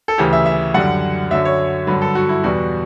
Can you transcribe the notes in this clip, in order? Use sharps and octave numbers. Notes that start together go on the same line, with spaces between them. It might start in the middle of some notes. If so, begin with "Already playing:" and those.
A4
D2 C#3 E3 G4
E5
E5
F#2 D3 G3 F#5
F#2 D3 F#3 E5
C#5
G2 D3 F#3 B4
A4
F#4
E4
E2 B2 G3 F#4